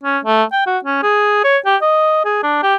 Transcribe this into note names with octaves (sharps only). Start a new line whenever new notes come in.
C#4
A3
G5
F#4
C#4
G#4
C#5
G4
D#5
G#4
D4
G4